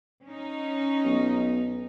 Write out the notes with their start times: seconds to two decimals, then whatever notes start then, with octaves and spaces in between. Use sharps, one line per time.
0.23 C#4 D#4
1.05 B1